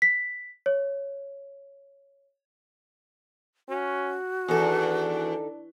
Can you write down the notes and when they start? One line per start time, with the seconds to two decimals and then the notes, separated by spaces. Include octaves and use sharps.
0.02 B6
0.66 C#5
3.69 C#4 F#4
4.48 E2 D#3 D4 D#4 A4